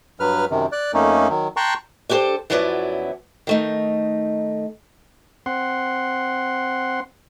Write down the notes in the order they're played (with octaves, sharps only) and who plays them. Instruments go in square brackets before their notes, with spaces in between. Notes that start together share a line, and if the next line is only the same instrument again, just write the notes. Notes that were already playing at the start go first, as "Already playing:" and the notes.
[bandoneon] G2 F#3 B4 F6
F#2 C3 D#3
D5 F#6
F2 A3 A#3 C#4 D#4
D#3 F#3
G5 A5 A#5 C6 C#6 F#6
[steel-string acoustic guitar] D4 E4 G4 A4 C5
F#2 F3 F#3 B3 E4 D5
D#3 A3 D#4
[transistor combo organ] C4 F#5 C6